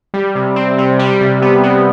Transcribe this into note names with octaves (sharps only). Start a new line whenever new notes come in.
G3
C3
C4
C3
G3
C3
B3
C3